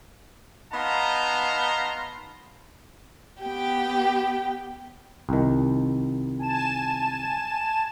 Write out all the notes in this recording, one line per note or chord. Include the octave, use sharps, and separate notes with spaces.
B3 D#4 F5 A5 A#5 C6
B3 G4 G5
C2 D#3
G#5 A5 E7